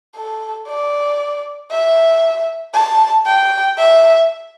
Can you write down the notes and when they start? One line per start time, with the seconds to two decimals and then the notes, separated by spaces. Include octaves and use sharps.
0.16 A4
0.68 D5
1.71 E5
2.74 A5
3.26 G5
3.78 E5